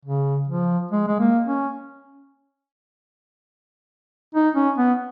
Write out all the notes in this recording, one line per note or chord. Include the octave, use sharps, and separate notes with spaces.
C#3
F3
G#3
G#3
A#3
C#4
D#4
C#4
B3